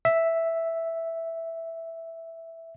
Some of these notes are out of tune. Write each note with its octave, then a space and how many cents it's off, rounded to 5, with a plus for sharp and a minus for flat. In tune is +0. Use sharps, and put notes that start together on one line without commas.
E5 +0